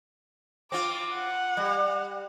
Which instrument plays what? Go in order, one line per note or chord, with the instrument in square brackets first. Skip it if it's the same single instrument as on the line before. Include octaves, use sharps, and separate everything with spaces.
[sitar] C4 F4 [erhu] D6
[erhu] F#5
[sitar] G3